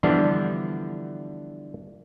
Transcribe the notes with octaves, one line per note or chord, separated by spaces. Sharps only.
D3 E3 F3 G3 B3 D4